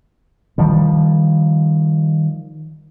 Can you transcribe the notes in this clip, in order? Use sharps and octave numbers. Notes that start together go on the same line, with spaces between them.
D#3 F3 G3